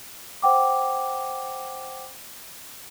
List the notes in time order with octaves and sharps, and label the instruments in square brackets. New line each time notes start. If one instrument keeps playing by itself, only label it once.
[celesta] C5 F#5 G5 D6